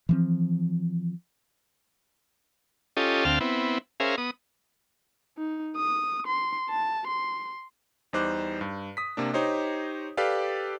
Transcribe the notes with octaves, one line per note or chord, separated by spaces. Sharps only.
E3 F3 C4
C#4 F4 G4 A4 D#5
D2 C4 F5 G5 A5 F6
B3 C4 E4
C#4 G#4 A#4 C5 E5 F5
B3 D#6
D#4
D#6
C6
A5
C6
E2 G3 D#4 C5 D6 F#6
G2
D#6 B6
C3 A#3 D4
D#4 G4 C5 C#5 D#5
G4 A4 B4 D5 F5